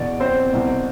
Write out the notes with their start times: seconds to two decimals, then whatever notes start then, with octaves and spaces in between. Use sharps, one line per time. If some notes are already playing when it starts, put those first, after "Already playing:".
Already playing: E2 B2 D5
0.20 C4 C5
0.52 C2 B2